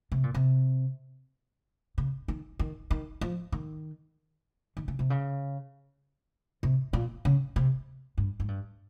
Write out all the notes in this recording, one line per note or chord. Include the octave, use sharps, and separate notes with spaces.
C3
A#2
C3
C#3
D#3
D#3
D#3
F3
D#3
D#3
C#3
C3
C#3
C3
A#2
C#3
C3
G2
G#2
G2